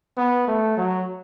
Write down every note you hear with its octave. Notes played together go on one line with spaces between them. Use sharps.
B3
A3
F#3